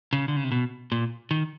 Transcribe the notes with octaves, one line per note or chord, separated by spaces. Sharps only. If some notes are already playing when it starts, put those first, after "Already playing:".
C#3
D3
C#3
C3
B2
A#2
D#3